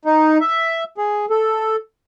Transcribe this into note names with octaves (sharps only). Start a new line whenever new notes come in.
D#4
E5
G#4
A4